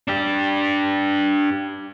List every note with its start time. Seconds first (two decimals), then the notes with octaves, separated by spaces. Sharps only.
0.08 D4 G4